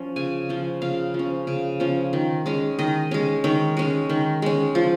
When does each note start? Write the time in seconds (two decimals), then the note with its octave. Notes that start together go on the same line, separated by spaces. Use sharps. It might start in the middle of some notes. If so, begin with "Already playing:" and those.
Already playing: F3 C#4
0.16 C#3 G#5
0.49 F3 C#4
0.82 C#3 F5
1.14 F3
1.19 C#4
1.47 C#3
1.80 F3 C#4
2.13 D#3
2.46 G#3 C#4
2.79 D#3 D#5
3.11 G#3 C#4
3.44 D#3 C#5
3.77 G#3 C#4
4.09 D#3
4.42 G#3 C#4
4.75 F3